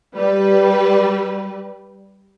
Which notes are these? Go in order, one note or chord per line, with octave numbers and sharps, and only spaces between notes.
G3 B4